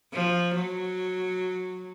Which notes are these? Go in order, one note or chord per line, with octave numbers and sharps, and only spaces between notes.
F3
F#3